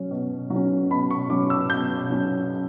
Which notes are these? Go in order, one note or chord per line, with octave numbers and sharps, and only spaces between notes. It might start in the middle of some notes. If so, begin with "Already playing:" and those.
Already playing: F#3 C#4
B2
F#3
C#4
B2 B5
C#6
F#3 C#4 D6
E6
B2 G6
F#3 C#4